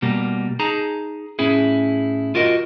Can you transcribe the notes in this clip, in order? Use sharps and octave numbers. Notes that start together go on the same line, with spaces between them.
B2 G3 A#3
D#4 G#4 A5 A#5
A2 C#4 E4 G#4
F4 F#4 A#4 D#5